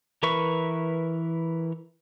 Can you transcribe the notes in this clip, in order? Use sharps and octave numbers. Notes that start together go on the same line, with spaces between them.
E3 A#4 B4 E5 C#6